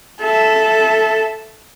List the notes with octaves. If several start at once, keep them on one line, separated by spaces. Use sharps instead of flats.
A4 E5